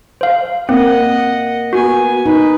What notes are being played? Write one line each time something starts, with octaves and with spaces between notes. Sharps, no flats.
C5 F5
A#3 C4 D#5 F#5
B3 F#4 G#5
D#4 B4